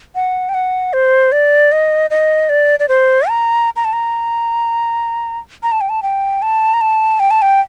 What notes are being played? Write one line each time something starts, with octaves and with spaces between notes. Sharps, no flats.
F#5
G5
F#5
C5
D5
D#5
D#5
D5
D5
C5
A#5
A#5
A5
A#5
A#5
A5
G5
A5
G5
A5
A#5
A5
G5
A5
G5